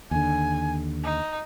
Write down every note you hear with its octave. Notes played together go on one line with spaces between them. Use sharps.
D#2 D3 G#5
D#4